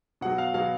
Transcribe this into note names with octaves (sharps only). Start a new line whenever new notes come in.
B2 F#3 F#5
F5
B2 F#3 F5